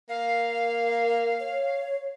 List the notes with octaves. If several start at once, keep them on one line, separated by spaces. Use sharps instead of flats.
A#3 F5
C#5